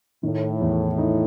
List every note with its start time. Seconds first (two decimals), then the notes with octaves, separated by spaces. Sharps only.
0.23 A2 D#3
0.61 E2
0.98 D#4